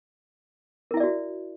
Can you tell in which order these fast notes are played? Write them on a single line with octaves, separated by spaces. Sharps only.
A#4 E4 E5 D5 F#4